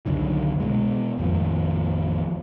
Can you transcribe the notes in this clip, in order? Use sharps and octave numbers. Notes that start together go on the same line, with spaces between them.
C2 F#2 D3 D#3
B2 G#3
A1 F2 D#3 F3